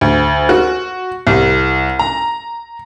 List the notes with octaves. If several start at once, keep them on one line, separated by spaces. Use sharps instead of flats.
D2
F#4
C2
A#5